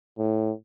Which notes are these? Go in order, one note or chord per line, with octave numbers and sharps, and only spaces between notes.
A2